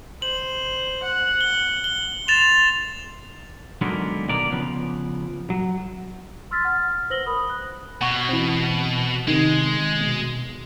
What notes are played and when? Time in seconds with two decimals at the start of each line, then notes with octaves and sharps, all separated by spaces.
0.22 C5 F#7
1.03 F#5
1.41 G7
1.84 G7
2.28 C6 A6 E7 F7
3.81 D3 D#3 F#3 G#3 A#3 B3
4.28 B2 D3 D#3 A#3 D5 A#5
4.51 C#3 F3 B3
5.50 F#3
6.51 C6 E6 F6 A6 B6
6.64 F#5 F6
7.10 B4 C5 E6 A#6 F#7 G7
7.26 A#4 B5 D#6
7.50 F#6
8.01 B2 F#5 C#6 G#6
8.29 E3 C4
9.28 C3 D#3 G#3
10.00 B2